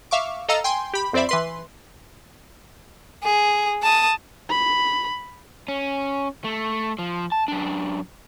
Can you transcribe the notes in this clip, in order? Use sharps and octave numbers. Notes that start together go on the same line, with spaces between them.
E5 F5 C#6 D6
A4 D#5 F5 A#5 E6
G5 G#5 C6
G4 B5
F2 C4 C5 D5 E5 B5
E3 B4 C6
G#4
A5 D#6
B5
C#4
A3
F3
A5
F#2 D4